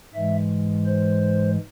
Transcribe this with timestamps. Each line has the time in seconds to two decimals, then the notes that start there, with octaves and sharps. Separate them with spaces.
0.14 G#2 E3 G#3 E5
0.86 C5